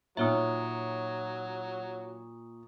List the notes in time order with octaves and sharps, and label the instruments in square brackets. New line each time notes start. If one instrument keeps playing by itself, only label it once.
[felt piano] A#2 [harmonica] F#3 [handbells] D#4 C#5 E5 [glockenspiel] A#5 C#6 D#6